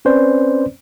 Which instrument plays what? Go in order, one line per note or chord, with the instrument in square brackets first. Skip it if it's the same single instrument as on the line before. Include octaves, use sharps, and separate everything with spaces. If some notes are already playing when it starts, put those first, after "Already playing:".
[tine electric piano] C4 C#4 B4 C5 D5